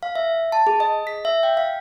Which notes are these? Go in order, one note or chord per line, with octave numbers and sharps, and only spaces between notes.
F5
E5
A5
G#4
D#5
B6
E5
G5
F5